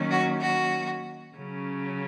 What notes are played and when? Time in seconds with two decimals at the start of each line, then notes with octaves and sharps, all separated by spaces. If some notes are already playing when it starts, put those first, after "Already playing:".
Already playing: D#3 F#3 A#3 C#4
0.11 F#4
0.42 F#4
1.35 C#3 F#3 C#4